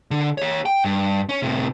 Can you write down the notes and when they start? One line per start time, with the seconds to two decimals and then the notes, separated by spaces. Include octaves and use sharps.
0.11 D3
0.38 G4 C#5
0.66 G5
0.85 G2
1.29 C#4
1.42 A2 C3